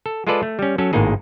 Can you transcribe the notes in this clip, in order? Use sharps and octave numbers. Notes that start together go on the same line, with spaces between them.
A4
G#3 F4 G#4 A4 B4 D5
A3
G3 C#4
F#3 C#4 A4
G#1 A2 G#3 A#3 D#4 G#4